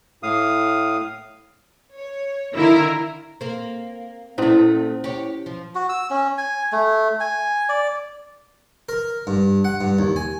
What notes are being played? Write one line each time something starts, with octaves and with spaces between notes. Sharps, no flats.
A2 F5 D#6
C#5
D3 D#3 E4 F4 A#4
A#3 C4
A#2 A3 C#4 E4 C5
G4 C#5
F3
F#4
E6
C#4
G#5
A3
G#5
D5
A#4
G2
F#5
G2
D#2
G#5